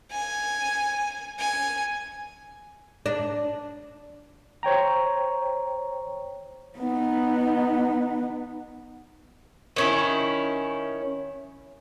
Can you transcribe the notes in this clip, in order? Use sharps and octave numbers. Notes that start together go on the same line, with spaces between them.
G#5
G#5
D4
C5 C#5 G5 A#5
B3 D#4
D#3 C#4 E4